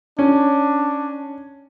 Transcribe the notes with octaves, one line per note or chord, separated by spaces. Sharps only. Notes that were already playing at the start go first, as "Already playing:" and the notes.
C#4 D4